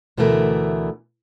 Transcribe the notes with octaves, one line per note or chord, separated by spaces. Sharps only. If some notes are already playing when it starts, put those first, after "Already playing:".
D2 B2 D3 E3 A3 A#4